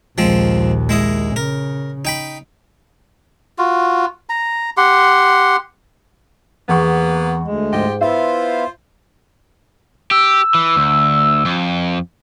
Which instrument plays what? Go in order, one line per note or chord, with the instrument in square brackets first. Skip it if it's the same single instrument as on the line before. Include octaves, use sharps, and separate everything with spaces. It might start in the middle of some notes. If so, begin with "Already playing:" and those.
[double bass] A#1 D#2 [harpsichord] F3 G#3 C4
[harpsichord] G#3 E4 D#5
[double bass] C#3 [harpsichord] A#4
[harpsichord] D#4 G5 B5
[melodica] F4 F#4
A#5
G4 F#5 C6
[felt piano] E2 C#6 [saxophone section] A#3 B3
[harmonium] D2 G#3
[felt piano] G#2 [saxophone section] F4 G4 D#5
[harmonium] B3 E4 F5 [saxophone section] F4 C5 [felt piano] E5
[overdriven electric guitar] G4 [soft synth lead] E6
[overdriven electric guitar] E3
D2
F2